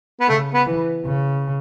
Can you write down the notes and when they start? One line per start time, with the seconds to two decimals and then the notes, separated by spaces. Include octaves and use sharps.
0.20 B3
0.28 C#3 A3
0.54 B3
0.66 E3
1.05 C#3